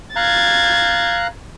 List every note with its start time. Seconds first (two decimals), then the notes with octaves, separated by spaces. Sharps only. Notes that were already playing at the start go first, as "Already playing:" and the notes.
0.16 F5 A#5 F#6 G#6 A6